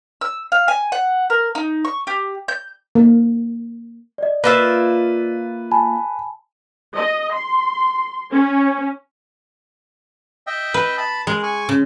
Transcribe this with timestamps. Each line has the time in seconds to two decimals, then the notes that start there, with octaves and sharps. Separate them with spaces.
0.21 E6
0.52 F5
0.68 G#5
0.92 F#5
1.30 A#4
1.55 D#4
1.85 C#6
2.07 G4
2.48 G6
2.95 A#3
4.18 D5 D#5
4.44 A#3 F4 B4 E5
5.71 G#5 A5 B5
6.94 D#5
7.34 C6
8.31 C#4
10.47 D#5 E5 G5
10.74 B4
10.98 A5 B5
11.27 G#3 G#4 A#4
11.43 G#5 C#6
11.69 C#3